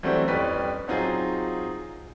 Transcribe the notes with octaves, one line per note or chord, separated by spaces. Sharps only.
E3 F#3 G3 A3 C4
F2 G3 C#4 B4 D5 B6
F#3 C4 D#4 F4 G#4